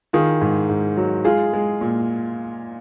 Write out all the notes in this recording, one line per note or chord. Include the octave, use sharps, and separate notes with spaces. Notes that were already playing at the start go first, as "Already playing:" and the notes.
D#3 F4 G#4
G#2
G#2
F#3
G#3 F4 G#4
G#3
A#2